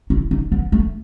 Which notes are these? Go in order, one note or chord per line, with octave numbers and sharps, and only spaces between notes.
E4
D#4
B3
A3